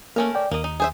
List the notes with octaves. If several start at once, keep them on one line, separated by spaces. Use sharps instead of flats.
A3 A#3 C#4 A#4
D5 G5
D#2 A#3 D#5
D#4
G#4 C5 E5